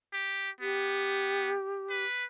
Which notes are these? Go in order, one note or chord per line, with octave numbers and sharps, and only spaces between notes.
G4
B3 G4
B4